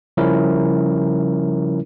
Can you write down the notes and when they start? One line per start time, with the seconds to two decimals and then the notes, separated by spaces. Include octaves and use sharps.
0.17 C#3 F3 G3 C#4 E4 A#4